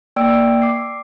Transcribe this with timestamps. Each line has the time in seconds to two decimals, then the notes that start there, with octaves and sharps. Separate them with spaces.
0.16 A#3 D5 G5 E6 D7
0.62 D6 C7